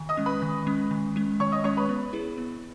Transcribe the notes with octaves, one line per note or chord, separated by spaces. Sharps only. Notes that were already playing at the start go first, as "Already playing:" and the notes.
Already playing: D#3
D#5 D#6
G#3 C#4
B4 B5
D#3
G#3 C#4
D#3
G#3 C#4
D#3 C#5 C#6
D#5 D#6
G#3 C#4 C#5 C#6
B4 B5
B3
E4 G#4 B4
B3